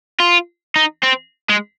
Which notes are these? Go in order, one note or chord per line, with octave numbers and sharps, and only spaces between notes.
F4
D#4
C4
G#3